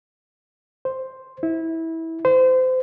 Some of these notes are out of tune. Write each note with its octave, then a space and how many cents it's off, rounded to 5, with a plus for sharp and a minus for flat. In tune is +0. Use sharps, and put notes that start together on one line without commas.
C5 +0
E4 -20
C5 -30